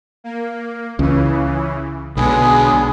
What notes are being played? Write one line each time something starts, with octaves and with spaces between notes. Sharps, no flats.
A#3
C#2 C#3 E3
B1 B2 D3 G#3 B3 G#5 B5 D#6